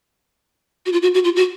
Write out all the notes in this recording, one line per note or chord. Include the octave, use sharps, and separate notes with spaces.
F#4
F4
F#4
F#4
F4
F#4